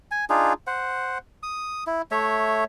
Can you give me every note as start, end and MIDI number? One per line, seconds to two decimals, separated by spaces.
0.11 0.25 80
0.30 0.53 62
0.30 0.53 63
0.30 0.53 65
0.30 0.53 68
0.67 1.18 72
0.67 1.18 78
1.43 1.84 87
1.87 2.02 64
2.11 2.64 57
2.11 2.64 73
2.11 2.64 76